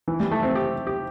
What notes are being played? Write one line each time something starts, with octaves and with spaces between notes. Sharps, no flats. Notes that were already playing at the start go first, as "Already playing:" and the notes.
E3
G3
A3
C4
G4
G4